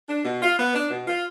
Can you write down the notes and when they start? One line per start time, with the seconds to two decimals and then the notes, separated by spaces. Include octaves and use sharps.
0.09 D4
0.25 B2
0.42 F4
0.58 B3
0.74 D4
0.90 B2
1.08 F4